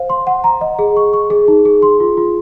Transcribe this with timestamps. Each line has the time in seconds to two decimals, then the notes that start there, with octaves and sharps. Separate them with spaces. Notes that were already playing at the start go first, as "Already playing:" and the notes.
Already playing: C5 F5
0.10 C6
0.27 F#5
0.44 A#5
0.61 D#5
0.79 G#4
0.97 C#6
1.13 C#6
1.30 G#4
1.48 D#4
1.65 G#4
1.82 C6
2.00 F4
2.17 F4